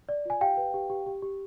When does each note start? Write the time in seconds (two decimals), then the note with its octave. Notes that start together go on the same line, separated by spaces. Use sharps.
0.09 D5
0.25 F4 G#5
0.41 G4 F5 G5
0.57 B4
0.74 G4
0.90 G4
1.06 G4
1.22 G4